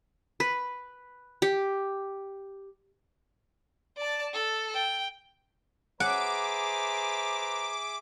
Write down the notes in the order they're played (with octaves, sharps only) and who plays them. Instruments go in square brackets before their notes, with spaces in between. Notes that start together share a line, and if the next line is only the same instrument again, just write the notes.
[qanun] B4
G4
[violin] D5 A5
A4
G5
[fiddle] G#4 E5 [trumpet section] B4 C5 A#5 [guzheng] F#5 [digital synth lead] D6